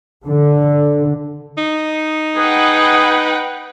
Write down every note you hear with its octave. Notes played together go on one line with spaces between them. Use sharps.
D3
D#4
G#4 B4 F#5 G5